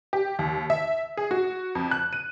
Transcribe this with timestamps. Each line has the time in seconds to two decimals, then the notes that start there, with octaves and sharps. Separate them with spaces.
0.13 G4
0.39 D#2
0.70 E5
1.17 G#4
1.31 F#4
1.75 F2
1.91 F#6
2.13 D#7